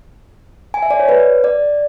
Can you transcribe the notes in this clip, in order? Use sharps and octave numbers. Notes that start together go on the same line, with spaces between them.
G#5
E5
D5
C#5
B4
D5